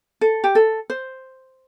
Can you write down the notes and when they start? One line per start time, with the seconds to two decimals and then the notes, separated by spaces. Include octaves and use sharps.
0.21 A4
0.44 G4
0.55 A4
0.90 C5